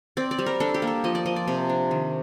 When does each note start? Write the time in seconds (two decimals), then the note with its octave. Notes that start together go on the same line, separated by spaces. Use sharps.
0.17 C4 D5
0.31 D5
0.39 G3
0.46 A#4
0.60 D4 A4
0.74 G4
0.82 A#3
0.87 A4
1.04 F3 D#5
1.15 D5
1.26 F3 D#5
1.36 D5
1.48 C3
1.69 D4
1.91 D#3